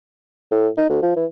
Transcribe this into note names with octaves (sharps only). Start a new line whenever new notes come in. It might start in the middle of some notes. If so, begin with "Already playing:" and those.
A2
D#4
D2
F3
E3